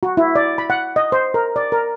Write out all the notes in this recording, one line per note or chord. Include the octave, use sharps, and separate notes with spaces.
F#4
E4
D5
B5
F#5
D#5
C5
A#4
D5
A#4